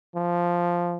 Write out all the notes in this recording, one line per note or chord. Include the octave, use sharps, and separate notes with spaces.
F3